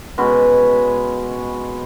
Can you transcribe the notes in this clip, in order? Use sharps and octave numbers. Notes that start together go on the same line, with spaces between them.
B2 G#3 C#4 B4